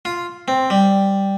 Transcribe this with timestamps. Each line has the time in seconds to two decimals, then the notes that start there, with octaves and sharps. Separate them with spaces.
0.05 F4
0.48 C4
0.70 G3